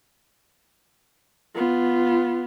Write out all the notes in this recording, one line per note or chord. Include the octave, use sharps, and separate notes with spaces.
B3 F4